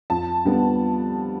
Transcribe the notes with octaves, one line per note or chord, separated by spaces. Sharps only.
F2 A5
D3 G3 B3